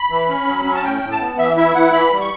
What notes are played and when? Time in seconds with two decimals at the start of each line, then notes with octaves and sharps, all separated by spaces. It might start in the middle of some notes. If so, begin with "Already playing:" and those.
Already playing: B5
0.10 E3
0.29 C#4
0.47 F#3
0.65 C#4
0.75 A5
0.83 A2 G5
1.02 A2
1.11 A5
1.20 B3
1.38 E3 E5
1.57 E4 E5
1.75 E3 F#5
1.93 E3 B5
2.11 G3
2.21 C#6